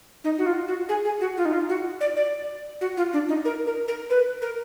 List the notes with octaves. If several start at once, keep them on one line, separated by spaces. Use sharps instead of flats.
D#4
F#4
F4
F#4
G#4
G#4
F#4
F4
D#4
F4
F#4
D5
D5
F#4
F4
D4
D#4
A#4
A#4
A#4
B4
A#4